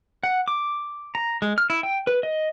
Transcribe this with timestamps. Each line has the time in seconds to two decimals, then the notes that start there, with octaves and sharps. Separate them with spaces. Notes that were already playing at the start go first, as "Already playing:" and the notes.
0.23 F#5
0.48 D6
1.15 A#5
1.42 G#3
1.58 F6
1.70 E4
1.83 G5
2.07 B4
2.23 D#5